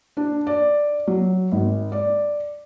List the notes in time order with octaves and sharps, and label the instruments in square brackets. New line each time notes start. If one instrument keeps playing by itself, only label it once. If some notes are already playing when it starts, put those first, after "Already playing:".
[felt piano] D4
D5
F#3
G#1
D5